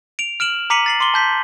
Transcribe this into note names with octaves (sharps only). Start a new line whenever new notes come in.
D7 F7
F6 D7 E7 F#7
A#5 D6 B6 C#7 D#7 F#7
A6 C7 F#7
C6 D6 G7
A5 G6 B6